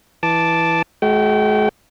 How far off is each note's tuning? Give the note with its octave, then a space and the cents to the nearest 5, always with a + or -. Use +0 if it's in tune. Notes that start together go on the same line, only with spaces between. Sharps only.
E3 +0 A5 -5 D6 +0
G#3 +40 F#4 +0 G5 -30